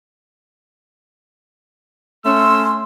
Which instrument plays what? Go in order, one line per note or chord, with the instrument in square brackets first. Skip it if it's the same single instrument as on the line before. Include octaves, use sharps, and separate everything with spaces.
[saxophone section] A3 C#4 [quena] C6 [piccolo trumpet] E6